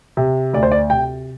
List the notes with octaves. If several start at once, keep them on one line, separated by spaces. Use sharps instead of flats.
C3
D2 D5
C5
D5
C3 G5